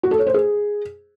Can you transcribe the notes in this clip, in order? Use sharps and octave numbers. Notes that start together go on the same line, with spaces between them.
F#4
A4
C#5
C5
G#4